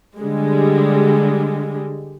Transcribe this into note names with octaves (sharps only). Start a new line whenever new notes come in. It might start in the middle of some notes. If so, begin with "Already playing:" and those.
D3 G3 G#3